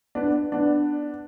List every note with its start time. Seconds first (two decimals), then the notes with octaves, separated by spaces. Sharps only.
0.15 B3 D4
0.52 B3 D4